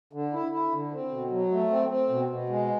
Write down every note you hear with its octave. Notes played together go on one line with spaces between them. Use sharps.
D3
E4
E4
D3
C4
B2
F#3
A3
C4
C4
B2
B2
G#3